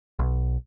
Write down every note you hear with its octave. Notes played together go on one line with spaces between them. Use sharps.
B1